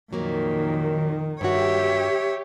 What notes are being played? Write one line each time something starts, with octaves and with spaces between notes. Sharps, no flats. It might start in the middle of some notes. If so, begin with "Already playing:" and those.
F2 A#2 D#3 F#3 A#3
G2 F#4 G4 C#5 E5